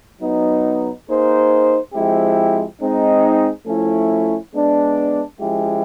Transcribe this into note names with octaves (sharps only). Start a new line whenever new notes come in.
F#3 B3 D#4
A#3 D#4 G#4 C5
F3 G#3 C4 E4 G4
G#3 C4 D#4
F3 A3 C#4 E4
G#3 B3 D4
F3 G#3 C#4 E4 G4